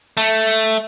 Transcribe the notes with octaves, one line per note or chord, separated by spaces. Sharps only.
A3